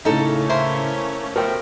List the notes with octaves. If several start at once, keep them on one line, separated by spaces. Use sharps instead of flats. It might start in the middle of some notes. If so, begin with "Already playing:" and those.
A2 C#3 A3 A#3 C#4 D#4 A4
E4 A#4 C5
B2 F3 A3 A#4 C5 G5